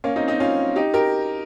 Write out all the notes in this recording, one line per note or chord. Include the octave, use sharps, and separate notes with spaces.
A#3 C#4
C4 D#4
C4 D#4
C#4 F4
D#4 G4
G4 A#4